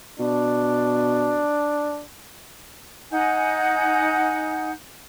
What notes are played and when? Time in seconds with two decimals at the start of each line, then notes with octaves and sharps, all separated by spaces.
0.20 B2 D4
3.12 D#4 F#5 G#5 G6